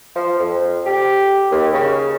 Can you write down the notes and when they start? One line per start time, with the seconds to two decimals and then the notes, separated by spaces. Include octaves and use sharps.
0.15 F3
0.39 F2
0.86 G4
1.51 D#2
1.73 C#3